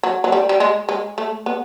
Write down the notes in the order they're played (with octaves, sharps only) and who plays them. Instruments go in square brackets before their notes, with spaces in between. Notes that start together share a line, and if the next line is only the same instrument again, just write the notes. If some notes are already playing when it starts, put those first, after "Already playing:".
[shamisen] F#3
F#3
G3
G3
G#3
G#3
A3
B3